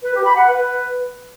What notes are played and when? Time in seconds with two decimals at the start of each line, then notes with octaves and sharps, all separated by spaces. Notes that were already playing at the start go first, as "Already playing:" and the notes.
0.03 B4
0.15 G4
0.26 B5
0.37 F#5
0.48 B4